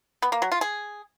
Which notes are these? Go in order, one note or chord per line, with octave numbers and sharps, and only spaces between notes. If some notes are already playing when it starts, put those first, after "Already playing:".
B3
A#3
F#3
F4
G#4